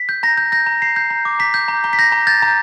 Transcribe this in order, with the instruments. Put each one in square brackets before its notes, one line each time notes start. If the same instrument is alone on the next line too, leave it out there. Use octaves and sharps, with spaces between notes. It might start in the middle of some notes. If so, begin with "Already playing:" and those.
Already playing: [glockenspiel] B6
G6
A#5 A#6
G6
G6 A#6
A#5
A#5 C7
G6
A#5
D6
A#5 B6
G6
A#5
A#5
B6
G6 A#6
A#5
G6 A6
A#5